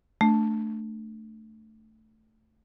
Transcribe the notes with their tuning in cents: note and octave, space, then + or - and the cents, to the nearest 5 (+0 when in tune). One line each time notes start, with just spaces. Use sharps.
A3 +0 D4 +0